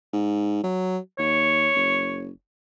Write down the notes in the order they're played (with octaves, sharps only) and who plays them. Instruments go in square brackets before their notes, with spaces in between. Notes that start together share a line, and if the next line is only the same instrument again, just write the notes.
[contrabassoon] G#2
F#3
[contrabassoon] D#2 [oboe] C#5
[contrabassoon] F#1